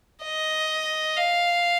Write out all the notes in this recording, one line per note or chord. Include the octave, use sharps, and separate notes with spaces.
D#5
F5